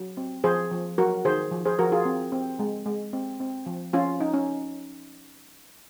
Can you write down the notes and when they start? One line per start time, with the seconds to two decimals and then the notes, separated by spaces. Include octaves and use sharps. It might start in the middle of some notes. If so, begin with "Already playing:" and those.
Already playing: F#3
0.17 C4
0.44 F3 G#4 C5
0.71 F3
0.98 F#3 F#4 A#4
1.25 D#3 G#4 C5
1.52 F3
1.65 G#4 C5
1.79 F3 F#4 A#4
1.92 F4 G#4
2.05 C4
2.32 C4
2.59 G#3
2.86 G#3
3.13 C4
3.40 C4
3.66 F3
3.93 F3 C#4 F4
4.20 C#4 D#4
4.34 C#4